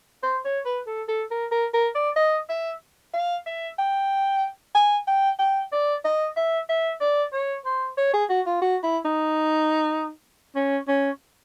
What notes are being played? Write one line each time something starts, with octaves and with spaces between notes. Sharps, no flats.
C5
C#5
B4
A4
A4
A#4
A#4
A#4
D5
D#5
E5
F5
E5
G5
G#5
G5
G5
D5
D#5
E5
E5
D5
C#5
C5
C#5
G#4
F#4
F4
F#4
E4
D#4
C#4
C#4